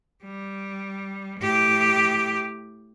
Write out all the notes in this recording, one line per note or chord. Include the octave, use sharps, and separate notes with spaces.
G3
A2 G4